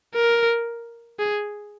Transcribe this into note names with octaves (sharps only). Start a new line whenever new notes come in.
A#4
G#4